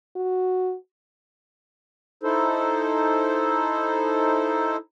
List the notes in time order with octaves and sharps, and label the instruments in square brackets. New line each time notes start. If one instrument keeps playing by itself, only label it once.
[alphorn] F#4
[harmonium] D#4 E4 A4 C5